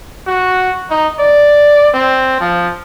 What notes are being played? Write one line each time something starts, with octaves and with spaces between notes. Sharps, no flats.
F#4
D#4
D5
C4
F3